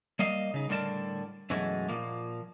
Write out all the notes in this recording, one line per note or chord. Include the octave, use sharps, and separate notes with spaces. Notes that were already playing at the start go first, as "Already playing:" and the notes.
G3 A#3 D#5 F5
C#3 D#4
A2 D3 G3 A#4 D5 A5
F#2 B2 E3 G#3 A3
A#2 F3 A#3